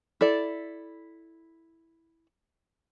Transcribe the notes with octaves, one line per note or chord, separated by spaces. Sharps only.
E4 A4 D5